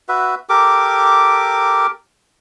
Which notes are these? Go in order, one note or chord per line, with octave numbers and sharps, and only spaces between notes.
F#4 B4 E5
G4 A4 A#4 D6